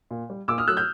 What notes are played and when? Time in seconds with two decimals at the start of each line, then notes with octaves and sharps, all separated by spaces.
0.10 A#2
0.30 G3
0.48 A#2 D6 E6
0.58 D#6 F6
0.67 F#3 A3 E6 F#6
0.77 F6 G6